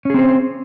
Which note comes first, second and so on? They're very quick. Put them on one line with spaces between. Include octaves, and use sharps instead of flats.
C#4 G#4 C4 C5